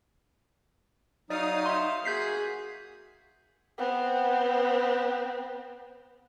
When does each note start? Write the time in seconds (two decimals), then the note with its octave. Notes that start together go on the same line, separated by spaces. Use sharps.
1.30 F#3 D#4 D5 F5 D#6
1.66 E5 C6
2.05 A#3 F#4 G#4 G6 B6 C7
3.78 B3 C4